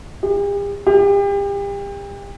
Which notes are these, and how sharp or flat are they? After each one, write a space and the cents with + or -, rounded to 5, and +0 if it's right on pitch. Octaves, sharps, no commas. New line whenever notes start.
G4 +45
G4 +35